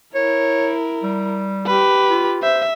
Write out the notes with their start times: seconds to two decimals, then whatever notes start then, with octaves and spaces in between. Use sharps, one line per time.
0.15 E4 A#4 C#5
1.03 G3
1.67 G4 B4
2.10 F4
2.43 C5 E5